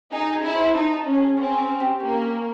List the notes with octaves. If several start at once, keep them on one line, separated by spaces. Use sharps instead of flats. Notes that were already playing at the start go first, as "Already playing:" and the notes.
D#4 G#4
G#4
E4
C5
D#4 A5
A5
C#4
G#4
C4 C#4
C#4
G4
A#3 C#4
C#4